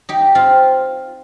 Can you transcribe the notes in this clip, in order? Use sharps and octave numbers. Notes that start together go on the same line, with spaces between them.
D#4 G4
C4 F4